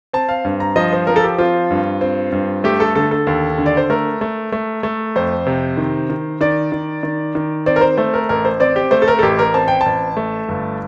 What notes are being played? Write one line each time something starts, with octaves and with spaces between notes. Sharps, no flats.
C4 A5
F5
G2
A#5
F3 D#5
C5
F3 A#4
A4
G4
C4 F4
G2
C4
G2
A3 G4
A4
D3 A4
A4
D#2
D3
D5
C5
A3 A#4
A3
A3
A3
F2 C5
C3
D#3
D#3
D#3 D5
D#3
D#3
D#3
C4 D5
A#4
C5
A3 C5
A#4
A1 A#4
C5
C4 D5
G4
A3 C5
A4
A#4
A4
A1 G4
A#4
C4 A5
G5
A1 A5
A3
G1